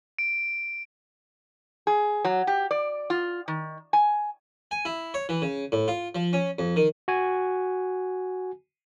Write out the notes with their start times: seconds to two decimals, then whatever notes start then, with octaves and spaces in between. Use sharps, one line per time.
0.19 D7
1.87 G#4
2.25 F#3
2.47 G4
2.71 D5
3.10 F4
3.48 D#3
3.93 G#5
4.71 G#5
4.85 E4
5.14 C#5
5.29 E3
5.42 C#3
5.72 A2
5.88 F4
6.15 F3
6.33 C#4
6.59 F2
6.76 D#3
7.08 F#4 G#5